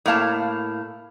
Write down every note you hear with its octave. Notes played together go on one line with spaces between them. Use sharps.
A2 A#3 F5 A5